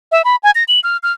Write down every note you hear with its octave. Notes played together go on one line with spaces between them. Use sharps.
E5
B5
G#5
A#6
F#7
F6
F6